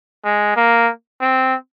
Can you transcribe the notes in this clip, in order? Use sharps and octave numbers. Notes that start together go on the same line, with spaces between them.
G#3
A#3
C4